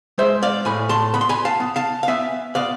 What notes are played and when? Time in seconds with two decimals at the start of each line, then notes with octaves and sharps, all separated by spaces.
0.18 G#3 C5 E5
0.43 D5 F5
0.65 A2 G#5 B5
0.89 A5 C6
1.14 B3 B5
1.21 C6
1.29 G#5 B5
1.45 F5 A5
1.60 B3
1.76 F5 A5
2.03 F5
2.08 B3 E5 G#5
2.55 B3 D5 F5